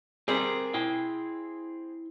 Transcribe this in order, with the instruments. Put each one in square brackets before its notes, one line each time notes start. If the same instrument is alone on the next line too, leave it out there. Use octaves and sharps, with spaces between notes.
[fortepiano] C4 G#4 [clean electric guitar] G4 A#4 D5
[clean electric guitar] E4 G5